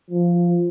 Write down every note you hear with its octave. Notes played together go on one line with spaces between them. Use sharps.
F3